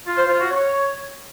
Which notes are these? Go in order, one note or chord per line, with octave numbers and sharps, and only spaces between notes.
F4
C5
F4
F#4
C#5